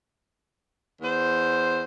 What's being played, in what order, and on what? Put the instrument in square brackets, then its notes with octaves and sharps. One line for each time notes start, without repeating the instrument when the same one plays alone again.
[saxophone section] E2 C5